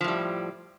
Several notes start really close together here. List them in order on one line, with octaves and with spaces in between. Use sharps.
F3 A2 G3